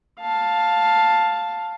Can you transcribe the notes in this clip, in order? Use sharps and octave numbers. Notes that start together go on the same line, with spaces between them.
F5 A5